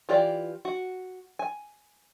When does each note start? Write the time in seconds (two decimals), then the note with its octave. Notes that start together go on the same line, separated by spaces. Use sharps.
0.09 E3 F4 G4 D5
0.65 F#4
1.39 G#5